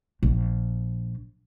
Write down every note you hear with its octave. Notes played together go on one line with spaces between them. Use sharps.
A#1